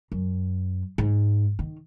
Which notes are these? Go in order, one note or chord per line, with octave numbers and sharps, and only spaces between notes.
F#2
G#2
D#3